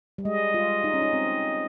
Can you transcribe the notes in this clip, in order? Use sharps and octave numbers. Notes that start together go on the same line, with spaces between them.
G3
G#3 D#5
F4
D#4
C#4
D#4
C4